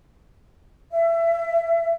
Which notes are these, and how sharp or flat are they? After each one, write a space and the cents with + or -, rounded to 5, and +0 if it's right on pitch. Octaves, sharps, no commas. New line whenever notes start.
E5 +25